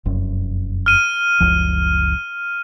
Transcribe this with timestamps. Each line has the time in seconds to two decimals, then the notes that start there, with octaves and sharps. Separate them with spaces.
0.05 F1 F#2
0.86 F6 D#7
1.40 F#1 C#2 F3